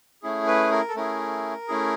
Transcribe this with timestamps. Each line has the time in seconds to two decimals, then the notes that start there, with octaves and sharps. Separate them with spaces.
0.23 A3 C#4 E4 G#4
0.47 B4
0.72 A#4
0.88 A4
0.96 A3 C#4 E4 G#4 A#4
1.68 A3 C#4 E4 G#4